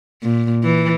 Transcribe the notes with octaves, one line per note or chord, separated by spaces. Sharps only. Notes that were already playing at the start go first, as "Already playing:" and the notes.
A#2
E3